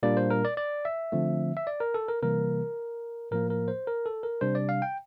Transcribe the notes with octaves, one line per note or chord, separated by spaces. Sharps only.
A#2 G3 A#3 D4 D5
C5
A#4
D5
D5
E5
D3 F3 A3 C4
E5
D5
A#4
A4
A#4
C3 E3 G3 A#3 A#4
A2 F3 A#3 A#4
A#4
C5
A#4
A4
A#4
C3 G3 D4 C5
D5
F5
G5